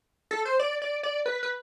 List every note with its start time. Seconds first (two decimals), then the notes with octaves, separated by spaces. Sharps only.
0.31 A4
0.45 C5
0.59 D5
0.82 D5
1.03 D5
1.26 B4
1.43 B4